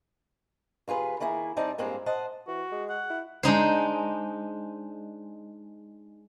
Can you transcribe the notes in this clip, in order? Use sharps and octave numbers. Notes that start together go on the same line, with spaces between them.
D#2 F4 G#4 B4
D#3 A#3 E4 G#4
G3 C4 D#4 D5 A5
G2 G#3 A#3 C4 F4
C5 D#5 F#5 A5
E3 F#4
G#3
F#5
E4
G#3 D4 D#4 C5